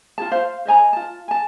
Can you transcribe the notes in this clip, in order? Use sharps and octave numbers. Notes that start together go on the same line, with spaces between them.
F4 G#4 A5
C5 F5
C5 D#5 G#5 A#5
F4 A5
G#5 A5